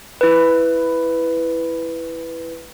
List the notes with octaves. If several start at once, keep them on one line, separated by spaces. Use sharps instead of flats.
E4 B4